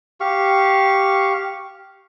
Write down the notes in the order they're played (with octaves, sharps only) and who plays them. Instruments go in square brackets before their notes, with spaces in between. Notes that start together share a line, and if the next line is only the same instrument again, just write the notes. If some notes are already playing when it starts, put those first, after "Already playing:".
[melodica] G4 F5 C#6